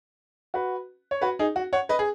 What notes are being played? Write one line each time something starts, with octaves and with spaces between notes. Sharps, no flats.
F#4 B4
C#5
F#4 B4
D#4 G#4
F#4
C#5 F#5
B4 D#5
G#4